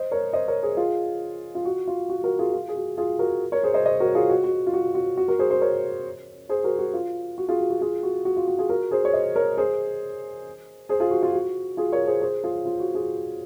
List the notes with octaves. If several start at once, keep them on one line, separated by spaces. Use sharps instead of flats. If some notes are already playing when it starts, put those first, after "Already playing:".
Already playing: C5 D#5
A#4 C#5
C5 D#5
A#4 C#5
G#4 C5
F4 G#4
F4
F#4
F4
F#4
F#4 A#4
F4 G#4
F4
G#4
F#4
F4 G#4
F#4 A#4
A#4 C#5
G#4 C5
C5 D#5
C5 D#5
F#4 A#4
F4 G#4
F#4
F#4
F4
F#4
F#4
F#4
F#4 A#4
G#4 C5
G#4 C5
A#4 C#5
G#4 C5
F#4 A#4
F#4
F4
F#4
F4 G#4
F#4
F#4
F4 G#4
F#4
F#4
F4
F#4
F4 G#4
F#4 A#4
G#4 C5
C#5
C5 D#5
A#4 C#5
G#4 C5
G#4 C5
F4 G#4
F#4
F4
F#4
F4 G#4
A#4 C#5
G#4 C5
G#4 C5
F4 G#4
F4
F#4
F4 G#4